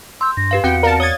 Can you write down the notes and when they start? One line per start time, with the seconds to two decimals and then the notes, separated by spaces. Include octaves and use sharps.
0.21 C6 E6 G6
0.37 G2 A#6
0.51 G4 B4 F5
0.64 E2 C4 F#4 F#5 G5 C#7
0.83 A#4 D5 F5 A5
1.00 C#5 D#6 G#6 A6